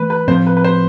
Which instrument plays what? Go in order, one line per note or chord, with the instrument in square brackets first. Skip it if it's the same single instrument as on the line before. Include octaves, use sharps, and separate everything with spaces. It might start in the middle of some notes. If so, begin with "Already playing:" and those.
Already playing: [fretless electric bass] E3 A3 [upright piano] B4
[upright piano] B4
[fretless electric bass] A2 F3 C4 [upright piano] C5
[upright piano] B4
B4
C5